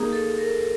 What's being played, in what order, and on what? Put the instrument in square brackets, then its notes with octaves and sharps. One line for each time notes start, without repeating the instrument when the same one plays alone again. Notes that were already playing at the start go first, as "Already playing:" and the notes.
Already playing: [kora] A#3 D#4 [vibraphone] G#4
[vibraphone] A4
A#4